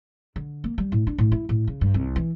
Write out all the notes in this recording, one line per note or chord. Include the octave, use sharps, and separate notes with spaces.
D3
A#3
G3
A2
D4
A2
E4
A2
C#3
G2
C2
E3